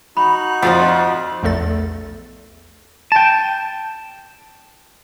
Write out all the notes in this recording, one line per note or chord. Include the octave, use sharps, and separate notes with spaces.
D#4 F#4 B5 F#6
F2 F3 F4 D5 D#5 F#5
A#1 E2 A3 A4 A6
G5 A5